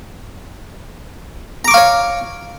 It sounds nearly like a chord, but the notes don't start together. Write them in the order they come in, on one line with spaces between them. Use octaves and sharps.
A#5 D6 C#6 F5 C#5